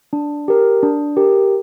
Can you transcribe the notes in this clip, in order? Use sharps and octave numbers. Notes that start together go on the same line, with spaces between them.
D4
G4 A#4
D4
G4 A#4